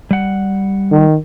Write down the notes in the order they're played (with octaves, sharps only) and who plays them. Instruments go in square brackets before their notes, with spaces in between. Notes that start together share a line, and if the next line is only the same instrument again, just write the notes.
[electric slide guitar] G3 F#5
[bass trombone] D#3